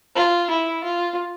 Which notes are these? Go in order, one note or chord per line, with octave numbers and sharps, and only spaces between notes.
F4
E4
F4